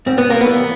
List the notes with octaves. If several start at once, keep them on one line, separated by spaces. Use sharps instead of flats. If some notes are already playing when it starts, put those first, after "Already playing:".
G#2 C4
B3
A#3
B3
E3 G3